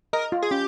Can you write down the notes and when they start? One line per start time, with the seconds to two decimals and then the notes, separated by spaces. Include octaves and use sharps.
0.13 A#4 D#5
0.32 F4
0.42 G#4
0.51 C#4 G4